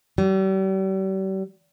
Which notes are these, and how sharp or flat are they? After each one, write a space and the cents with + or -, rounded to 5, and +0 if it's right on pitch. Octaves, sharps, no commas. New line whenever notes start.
G3 -40